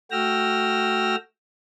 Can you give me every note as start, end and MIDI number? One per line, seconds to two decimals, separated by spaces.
0.11 1.16 57
0.11 1.16 66
0.11 1.16 79
0.11 1.16 88
0.11 1.16 89
0.11 1.16 94